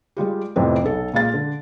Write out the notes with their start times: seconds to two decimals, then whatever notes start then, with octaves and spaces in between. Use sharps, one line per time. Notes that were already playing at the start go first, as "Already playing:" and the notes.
0.17 G3 G#3 F4 G4
0.56 F2 A2 C3 B3 C4
0.84 B1 A4
1.13 A#2 G#3 F5 A6
1.34 D3